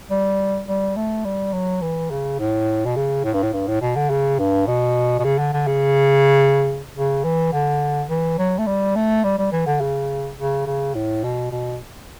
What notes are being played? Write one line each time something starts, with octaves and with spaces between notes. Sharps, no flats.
G3
G3
A3
G3
F#3
E3
C#3
A2
B2
C#3
A2
G2
A2
G2
A2
B2
D3
C#3
G2
B2
B2
C#3
D3
D3
C#3
C#3
E3
D3
E3
F#3
A3
G3
A3
G3
G3
E3
D3
C#3
C#3
C#3
A2
B2
B2